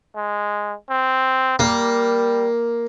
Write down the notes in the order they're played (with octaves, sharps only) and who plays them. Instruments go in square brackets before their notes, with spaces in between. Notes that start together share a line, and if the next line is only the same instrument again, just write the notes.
[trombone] G#3
C4
[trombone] G3 [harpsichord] A#3